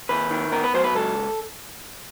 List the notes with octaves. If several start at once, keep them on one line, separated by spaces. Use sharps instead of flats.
D#2 B4
D#3
B3 A#4
B4
F#3 C5
B4
C#2 A4